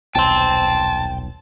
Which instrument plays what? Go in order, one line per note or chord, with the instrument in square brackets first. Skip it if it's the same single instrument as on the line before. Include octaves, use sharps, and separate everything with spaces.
[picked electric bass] D#1 B1 [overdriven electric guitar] G5 C6 [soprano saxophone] A5